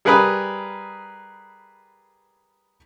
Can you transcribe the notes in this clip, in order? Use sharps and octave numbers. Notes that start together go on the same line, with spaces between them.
G3 G#4 A#4 B4 B5 D#6